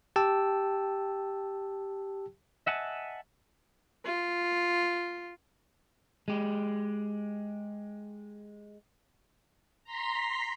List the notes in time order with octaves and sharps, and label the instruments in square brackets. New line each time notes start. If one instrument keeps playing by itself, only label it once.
[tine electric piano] G4 G5 A5 E6
[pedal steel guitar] D#5 E5 F#5 G#5 A5
[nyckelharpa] F4
[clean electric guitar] G#3 G4
[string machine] A#5 C6 B6